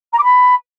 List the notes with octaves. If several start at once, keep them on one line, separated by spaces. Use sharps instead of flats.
A#5
D6
B5